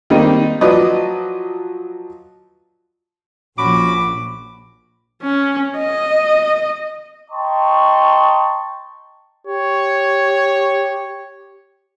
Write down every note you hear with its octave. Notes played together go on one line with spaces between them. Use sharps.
D#3 G3 A#3 C4 D#4
F3 F#3 B4 D5 D#5
A#1 C#4 F#4 B5 D6
C#4
D#5
D#5 G5 A5 A#5 C6 C#6
G4 C#5